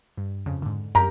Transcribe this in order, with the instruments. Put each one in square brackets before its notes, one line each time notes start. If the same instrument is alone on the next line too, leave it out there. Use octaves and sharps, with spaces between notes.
[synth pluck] G2
F2 C#3
G#2 D3
[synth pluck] F#2 G4 A#4 [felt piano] A#5